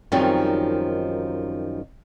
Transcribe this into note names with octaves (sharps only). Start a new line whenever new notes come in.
F#2 D#3 F3 G3 C4 D#4